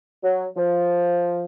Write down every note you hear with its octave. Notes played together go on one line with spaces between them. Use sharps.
F#3
F3